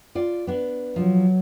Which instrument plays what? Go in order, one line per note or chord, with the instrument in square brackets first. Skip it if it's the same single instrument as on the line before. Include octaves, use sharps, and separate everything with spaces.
[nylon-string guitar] F4 D5
B3 D4
[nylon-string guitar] F3 [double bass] F#3